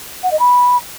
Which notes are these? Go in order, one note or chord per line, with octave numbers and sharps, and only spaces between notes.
F#5
D#5
B5